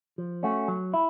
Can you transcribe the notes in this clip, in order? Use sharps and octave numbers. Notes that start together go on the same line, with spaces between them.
F3
A3 C#4 F#4
F#3
E4